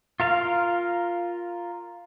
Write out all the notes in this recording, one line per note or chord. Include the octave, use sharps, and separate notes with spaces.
F4 A#4 F5